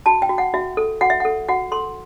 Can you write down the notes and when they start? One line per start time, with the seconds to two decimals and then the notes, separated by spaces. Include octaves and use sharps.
0.06 F#4 A5
0.22 G5
0.29 F#4
0.38 F#5
0.54 F#4 E5
0.77 A4
1.01 F#4 F#5
1.10 E5
1.20 A4 F#5
1.48 F#4 F#5
1.72 A4 C6